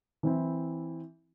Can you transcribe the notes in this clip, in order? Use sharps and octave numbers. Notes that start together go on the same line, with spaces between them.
E3 C4 E4